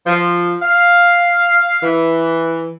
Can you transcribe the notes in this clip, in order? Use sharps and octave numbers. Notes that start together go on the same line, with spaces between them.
F3
F5
E3